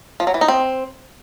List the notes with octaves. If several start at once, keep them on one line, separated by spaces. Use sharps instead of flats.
F3
F#3
E3
D#4
C4